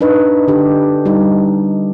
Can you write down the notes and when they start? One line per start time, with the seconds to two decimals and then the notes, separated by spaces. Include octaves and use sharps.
0.01 D4 D#4 B4 D#5
0.48 D3 D4 G4
1.06 G3 D#4